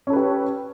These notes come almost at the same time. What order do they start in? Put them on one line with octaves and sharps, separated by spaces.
C#4 A4 B4 G4